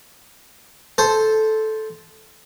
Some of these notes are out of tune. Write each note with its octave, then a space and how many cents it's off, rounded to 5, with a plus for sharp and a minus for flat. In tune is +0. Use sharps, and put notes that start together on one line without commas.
A4 -10 C5 +0